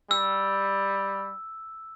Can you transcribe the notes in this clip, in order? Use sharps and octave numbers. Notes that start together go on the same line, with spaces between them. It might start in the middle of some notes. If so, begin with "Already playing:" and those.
G3 E6